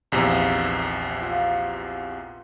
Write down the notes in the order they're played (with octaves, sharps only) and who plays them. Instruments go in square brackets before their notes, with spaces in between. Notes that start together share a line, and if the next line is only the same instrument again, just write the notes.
[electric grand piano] A#1 E2 C3 [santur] A#3 B3 D#4
[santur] E5
F4 F#5